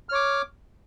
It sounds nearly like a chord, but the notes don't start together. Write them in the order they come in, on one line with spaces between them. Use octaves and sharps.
F6 C#5 D6